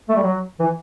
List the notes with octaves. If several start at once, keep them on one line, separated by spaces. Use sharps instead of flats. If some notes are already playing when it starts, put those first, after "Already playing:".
A3
G3
F#3
E3